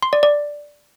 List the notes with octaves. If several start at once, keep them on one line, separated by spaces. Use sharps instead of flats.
C6
D5
D5